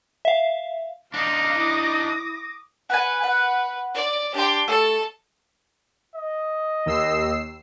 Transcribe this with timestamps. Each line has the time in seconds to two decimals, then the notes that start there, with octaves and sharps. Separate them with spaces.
0.25 E5 F5
1.14 D4 D#4 F5 D6 D#6 A#6
1.59 E4
2.90 B4 F#5 G#5
3.24 F#5
3.94 D5
4.34 D4 G4 G5 C6
4.68 A3 A4
6.15 D#5
6.86 D#2 E6 C7